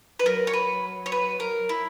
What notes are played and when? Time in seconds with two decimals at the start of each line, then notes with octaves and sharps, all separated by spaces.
0.19 B4
0.25 F#3 A#4
0.47 C#5
0.53 B4
1.06 C#5
1.12 B4
1.40 A#4
1.69 E4